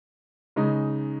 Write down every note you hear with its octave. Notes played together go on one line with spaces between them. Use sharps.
C#3 G#3 D#4